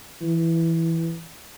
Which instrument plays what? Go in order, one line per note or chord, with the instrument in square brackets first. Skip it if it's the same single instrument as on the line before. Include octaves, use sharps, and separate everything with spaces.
[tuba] E3